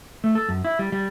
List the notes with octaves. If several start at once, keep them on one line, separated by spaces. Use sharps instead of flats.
A3
A4
F#2
E4
G3
G3